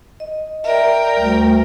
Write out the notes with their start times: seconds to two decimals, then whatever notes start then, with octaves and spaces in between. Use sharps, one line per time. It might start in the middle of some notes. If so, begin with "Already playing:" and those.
0.20 D#5
0.64 A#4 D5 E5 G5
1.17 D2 G3